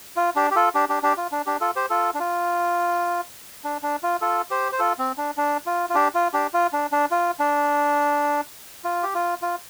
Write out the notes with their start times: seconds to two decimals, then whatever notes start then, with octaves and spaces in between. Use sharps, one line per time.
0.17 F4
0.36 D4 G4
0.51 G4
0.55 F4 A4
0.75 D4 G4
0.89 D4 G4
1.03 D4 G4
1.17 F4
1.32 D4
1.46 D4 G4
1.61 F4 A4
1.76 G4 C5
1.90 F4 A4
2.14 D4
2.20 F4
3.64 D4
3.83 D4
4.03 F4
4.21 F4 A4
4.50 G4 C5
4.72 C5
4.79 F4 A4
4.99 C4
5.18 D4
5.37 D4
5.66 F4
5.90 F4
5.95 D4 G4
6.15 F4
6.33 D4 G4
6.53 F4
6.73 D4
6.92 D4
7.11 F4
7.40 D4
8.85 F4
9.03 G4
9.14 F4
9.42 F4